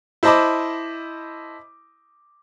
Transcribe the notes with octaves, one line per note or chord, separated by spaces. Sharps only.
E4 C5 D#5 A5 B5 D6